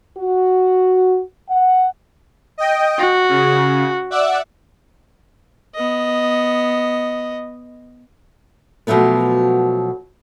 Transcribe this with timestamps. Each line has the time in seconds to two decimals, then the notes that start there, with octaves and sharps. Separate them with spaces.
0.18 F#4
1.49 F#5
2.58 D#5 G5
2.98 F#4
3.29 C#3
4.10 D5 E5 F#5
5.74 B3 D#5
8.87 B2 F3 F#3 A3 B3